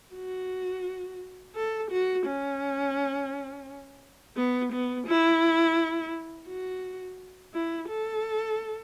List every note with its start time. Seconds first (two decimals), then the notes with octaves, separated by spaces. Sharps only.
0.15 F#4
1.55 A4
1.91 F#4
2.26 C#4
4.37 B3
4.72 B3
5.07 E4
6.48 F#4
7.54 E4
7.89 A4